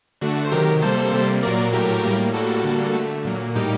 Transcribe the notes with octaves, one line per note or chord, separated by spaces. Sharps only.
D3 A3 D4 F#4
C5
C3 D#3 F#3 G4 A#4
C3 G3 A#3 A4 C5
C3 G3 A#3
A#2 F#3 A#3 A#4 D5
A2 F#3 A3 G4 A#4
A2 G3 A#3
A2 G3 A#3 F#4 A4
D3 G3 A#3
D3 A3
A#2 F#3 A#3
A2 G3 A#3 D#4 G4